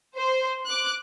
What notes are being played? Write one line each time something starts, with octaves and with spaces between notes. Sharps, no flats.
C5
D6 F#6